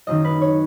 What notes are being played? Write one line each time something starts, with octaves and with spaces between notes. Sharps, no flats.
F#1 F#2 D#3 D#5
B4
C#5